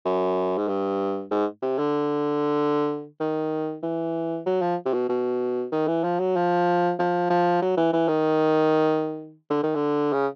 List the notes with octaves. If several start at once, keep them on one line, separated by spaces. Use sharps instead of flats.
F#2
G#2
G2
G#2
C3
D3
D#3
E3
F#3
F3
C3
B2
B2
D#3
E3
F3
F#3
F3
F3
F3
F#3
E3
E3
D#3
D3
D#3
D3
C#3